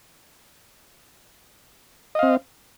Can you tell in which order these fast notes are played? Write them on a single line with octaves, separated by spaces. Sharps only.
D#5 F5 C4